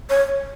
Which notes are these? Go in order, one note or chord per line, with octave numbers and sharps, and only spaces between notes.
C#5